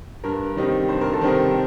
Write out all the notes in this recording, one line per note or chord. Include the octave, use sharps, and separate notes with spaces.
G2 A#4
D#3 G3 C4 D#4
G2 C5
A#4
A4
D#3 G3 C4 D#4 A#4